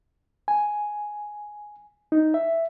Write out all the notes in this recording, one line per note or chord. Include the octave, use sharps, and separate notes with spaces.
G#5
D#4
E5